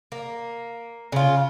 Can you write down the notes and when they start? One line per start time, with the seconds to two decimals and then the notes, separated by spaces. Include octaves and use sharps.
0.12 A#3
1.12 C#3 F4